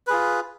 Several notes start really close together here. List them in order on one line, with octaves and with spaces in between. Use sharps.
B4 G#4 F4